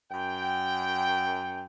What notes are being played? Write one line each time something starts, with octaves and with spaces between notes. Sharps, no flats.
F#2 G5